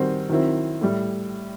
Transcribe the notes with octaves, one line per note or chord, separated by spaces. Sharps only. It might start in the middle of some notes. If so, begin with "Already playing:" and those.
Already playing: D#3 G3 C4 F#4 C5
D#3 F#3 C4 E4
A2 G3